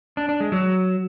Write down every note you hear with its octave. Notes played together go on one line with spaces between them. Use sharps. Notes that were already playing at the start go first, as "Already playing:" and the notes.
D4
D4
G#3
F#3